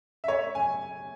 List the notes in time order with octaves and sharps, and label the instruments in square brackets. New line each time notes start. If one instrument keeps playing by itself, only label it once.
[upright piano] E5
C#5
G#5